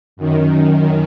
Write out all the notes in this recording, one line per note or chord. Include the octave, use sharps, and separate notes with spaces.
F#2 D#3